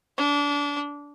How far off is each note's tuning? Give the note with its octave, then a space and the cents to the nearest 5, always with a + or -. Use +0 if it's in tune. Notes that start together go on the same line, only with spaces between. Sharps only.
D4 -25